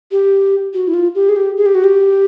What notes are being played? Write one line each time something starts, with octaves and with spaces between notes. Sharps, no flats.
G4
F#4
E4
F4
G4
G#4
G4
G#4
G4
F#4
G4